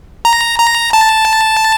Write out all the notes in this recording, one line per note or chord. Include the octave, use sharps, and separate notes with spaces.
A#5
A#5
A5